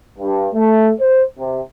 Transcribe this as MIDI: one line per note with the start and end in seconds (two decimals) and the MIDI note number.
0.18 0.48 43
0.53 0.91 57
1.00 1.24 72
1.38 1.61 48